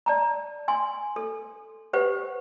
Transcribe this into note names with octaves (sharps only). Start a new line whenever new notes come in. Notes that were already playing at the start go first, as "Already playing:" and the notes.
D5 A5 A#5
G#5 C6
A4
G4 B4 C5 F#5